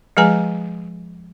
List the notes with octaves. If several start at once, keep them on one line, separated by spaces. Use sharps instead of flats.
F3 G#3 G#4 B4 G#5 A#5